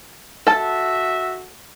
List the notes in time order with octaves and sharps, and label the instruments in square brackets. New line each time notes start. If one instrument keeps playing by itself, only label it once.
[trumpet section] F#4 E5 [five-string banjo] A4 A5